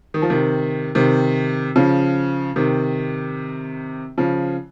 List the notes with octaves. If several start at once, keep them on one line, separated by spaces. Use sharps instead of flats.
D#3
F3
C3 D#3
C3 D#3
C#3 F3
C3 D#3
C#3 F3